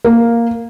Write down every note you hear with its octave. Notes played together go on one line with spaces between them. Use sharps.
A#3